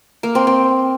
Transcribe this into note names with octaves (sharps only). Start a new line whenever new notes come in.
A#3
C4
C4